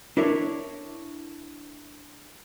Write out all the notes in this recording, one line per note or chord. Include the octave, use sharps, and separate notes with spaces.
D4 E4 A#4 C#5